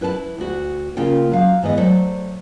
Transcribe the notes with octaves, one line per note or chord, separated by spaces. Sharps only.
E4 B4 G#5 A5
D2 F#4
C#3 A#3 F4 G5
F#3 F5
G#2 E3 B3 D#5
F#3 A3 A4 C5 D5